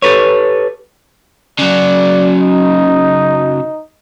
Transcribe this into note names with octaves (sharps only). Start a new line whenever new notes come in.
G4 A4 B4 C#5
C#3 F#3 D5
D#4